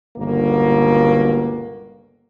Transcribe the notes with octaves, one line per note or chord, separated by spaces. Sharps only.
G1 C#2 B2 A#3